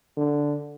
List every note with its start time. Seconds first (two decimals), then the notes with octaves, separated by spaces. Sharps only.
0.17 D3